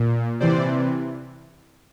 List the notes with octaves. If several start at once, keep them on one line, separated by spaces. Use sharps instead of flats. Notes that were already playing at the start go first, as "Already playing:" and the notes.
Already playing: A#2
C3 E3 C5 D5